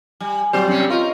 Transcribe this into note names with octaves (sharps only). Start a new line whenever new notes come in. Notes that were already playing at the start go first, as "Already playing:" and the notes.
G3 G#5
A#2 F#3 G3 C4 C5
F#2 C3 C#4
F4 A#4 D#5 C#6